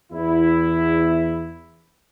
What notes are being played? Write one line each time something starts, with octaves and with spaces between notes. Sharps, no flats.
E2 E4